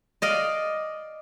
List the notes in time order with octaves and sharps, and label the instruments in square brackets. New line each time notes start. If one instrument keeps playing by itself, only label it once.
[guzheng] D5 D#5 F5